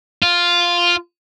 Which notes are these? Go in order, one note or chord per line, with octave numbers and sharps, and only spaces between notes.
F4